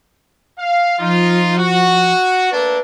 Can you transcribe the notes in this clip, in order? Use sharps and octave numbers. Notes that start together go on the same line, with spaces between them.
F5
F3 D#4 F4
F#4
A3 A#3 D4 B4